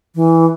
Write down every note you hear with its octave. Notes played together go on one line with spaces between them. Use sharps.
E3